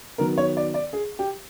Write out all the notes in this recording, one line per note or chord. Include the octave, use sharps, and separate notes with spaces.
D#3 F#3 B3 A#4
C#5
D5
D5
G#4
G4